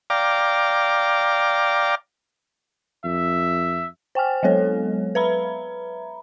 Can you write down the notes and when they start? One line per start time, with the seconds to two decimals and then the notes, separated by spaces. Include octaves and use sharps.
0.10 D5 F5 G5 A#5 D6
3.04 F2 E5
4.15 C5 G5 G#5 F6
4.43 F#3 G#3 B3 A4 C#5
5.15 B4 E5 A#5 B5